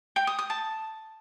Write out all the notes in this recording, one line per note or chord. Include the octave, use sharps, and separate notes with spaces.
G5
D#6
D#6
A5